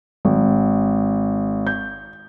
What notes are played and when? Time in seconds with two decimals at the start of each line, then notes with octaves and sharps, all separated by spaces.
0.25 G#1
1.67 G6